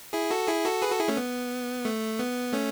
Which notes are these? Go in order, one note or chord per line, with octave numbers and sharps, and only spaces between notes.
E4 G#4
F#4 A4
E4 G#4
F#4 A4
G#4 B4
F#4 A4
E4 G#4
A3 C#4
B3
A3
B3
A3 C#4